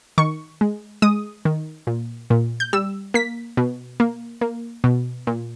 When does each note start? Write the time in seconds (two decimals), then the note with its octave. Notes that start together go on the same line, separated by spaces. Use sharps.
0.18 D#3 C#6
0.61 G#3
1.02 G#3 D#6
1.45 D#3
1.87 A#2
2.30 A#2
2.60 G6
2.73 G3 E6
3.14 A#3 B6
3.57 B2
4.00 A#3
4.41 A#3
4.84 B2
5.27 A#2